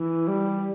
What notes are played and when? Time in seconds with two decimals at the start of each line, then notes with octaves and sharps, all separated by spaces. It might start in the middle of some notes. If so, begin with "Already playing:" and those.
Already playing: E3
0.28 G3